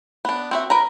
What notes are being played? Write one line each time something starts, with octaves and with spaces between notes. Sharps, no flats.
B3 D4
C4 F#4 E5
A#4 B4 A#5